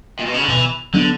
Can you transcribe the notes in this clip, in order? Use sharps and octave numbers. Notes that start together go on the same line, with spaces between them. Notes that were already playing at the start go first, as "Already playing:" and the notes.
A#2
B2
C#3
D3
B2 E3
D3 F#3 B3 D4